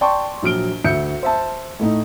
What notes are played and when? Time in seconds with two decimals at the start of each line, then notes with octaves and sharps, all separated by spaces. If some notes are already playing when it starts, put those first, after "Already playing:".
0.01 D5 G5 A5 C6 C#6
0.42 A#1 F#3 F6 D7 G7
0.84 D2 E5 G6 C#7
1.23 C5 E5 A5
1.79 A2 A3 D#4